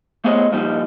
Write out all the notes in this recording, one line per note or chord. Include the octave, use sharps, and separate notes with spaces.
A3 B3 G#4 C5 C#5 D#5
G2 A#2 F3 G3 D#4